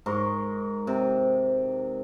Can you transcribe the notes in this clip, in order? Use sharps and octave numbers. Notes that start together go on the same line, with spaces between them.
G#2 A#4 C6 C#6
C3